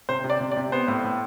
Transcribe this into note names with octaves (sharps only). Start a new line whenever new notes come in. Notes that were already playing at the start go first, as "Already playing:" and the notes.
C3 C5
C3
D5
C3
D5
C3
B3 C5
A2
A2